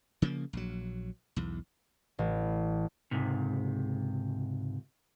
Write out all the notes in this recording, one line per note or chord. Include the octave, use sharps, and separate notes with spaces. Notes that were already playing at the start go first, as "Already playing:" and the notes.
C#3 F3 A#3
A#1 F#3
B1 E2
A1
C#2 G#2 C3